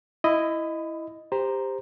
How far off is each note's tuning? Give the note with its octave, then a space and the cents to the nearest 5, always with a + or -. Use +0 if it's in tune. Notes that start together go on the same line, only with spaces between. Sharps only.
E4 +0 D#5 +0 B5 +25
G4 +20 C5 +0 A#5 +0